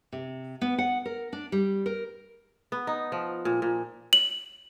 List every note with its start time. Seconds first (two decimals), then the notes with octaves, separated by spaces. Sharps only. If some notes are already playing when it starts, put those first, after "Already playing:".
0.12 C3
0.61 B3
0.78 F#5
1.06 A#4
1.33 D4
1.52 G3
1.86 A#4
2.72 B3
2.87 D#4
3.12 F3
3.45 A#2
3.62 A#2
4.13 F#7